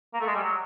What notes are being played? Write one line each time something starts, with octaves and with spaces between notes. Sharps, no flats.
A#3
A3
G#3
G3
F#3